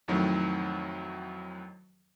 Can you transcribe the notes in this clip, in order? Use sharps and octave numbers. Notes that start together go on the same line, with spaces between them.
F2 A2 D#3 F#3